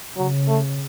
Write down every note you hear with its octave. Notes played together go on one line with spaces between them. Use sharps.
C#3 F#3
A3